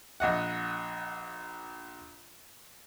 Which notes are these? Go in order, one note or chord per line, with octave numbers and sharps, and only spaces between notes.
A#1 D#5 F#5